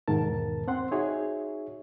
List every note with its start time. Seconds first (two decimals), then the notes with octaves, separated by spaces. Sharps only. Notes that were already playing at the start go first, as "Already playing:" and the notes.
0.08 E2 G#2 B2 D#3 A#4 A5
0.68 C4 F#5 C6
0.91 D#4 F#4 G#4 C#5 E5